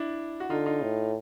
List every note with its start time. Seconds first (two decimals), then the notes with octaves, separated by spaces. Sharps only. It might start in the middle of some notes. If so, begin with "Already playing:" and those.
Already playing: D4 E4
0.40 F#4
0.50 D3 D#4 F4
0.66 D#4 F4
0.82 A2